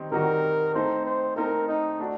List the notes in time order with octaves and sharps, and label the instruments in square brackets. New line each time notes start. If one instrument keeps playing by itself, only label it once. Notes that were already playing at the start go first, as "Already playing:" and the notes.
Already playing: [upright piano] D#3 G3 C4 D#4
[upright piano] D#3 G3 C4 D#4 F#4 [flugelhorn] A#4
[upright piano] A3 C4 D#4 A4 [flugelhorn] C5
[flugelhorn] C5
[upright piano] A3 C4 D#4 A4 [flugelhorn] A#4
[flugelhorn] D#4
[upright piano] A3 D4 F#4